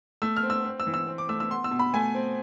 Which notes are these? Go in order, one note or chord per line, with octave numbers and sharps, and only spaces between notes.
A3 E6
F6
C4
E6
C4
E6
E3
E6
C4
D6
A3 E6
E6
B3 C6
E6
B2
B5
A3 G#5
C4